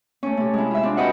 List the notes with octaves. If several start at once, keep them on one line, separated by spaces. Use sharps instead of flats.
A3 C#4
C3 A3
G#3 E4
F4 E5
C4 D4
F#4 B4 D#5 E5 F#5 G5